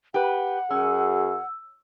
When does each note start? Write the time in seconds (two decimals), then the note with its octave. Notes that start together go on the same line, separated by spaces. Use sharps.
0.14 G4 B4 F#5
0.71 F#2 C#4 F#4 G#4 E6